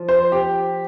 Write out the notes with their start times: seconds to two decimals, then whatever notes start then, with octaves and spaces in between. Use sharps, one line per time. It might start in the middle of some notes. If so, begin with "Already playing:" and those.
Already playing: F3
0.09 C5
0.32 G4